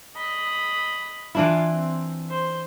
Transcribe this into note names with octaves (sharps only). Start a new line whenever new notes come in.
D#5 B5
E3 D4 E4 F4
C4
C5